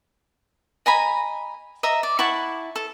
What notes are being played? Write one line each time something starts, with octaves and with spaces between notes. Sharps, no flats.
D#5 G#5 A#5 B5
D#5 E5 A#5
D5
E4 F#5 A5 C#6
A4